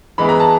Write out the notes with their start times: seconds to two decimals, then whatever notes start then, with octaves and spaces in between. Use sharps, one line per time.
0.18 E3 G#3 B3 B5
0.29 A#5
0.39 A5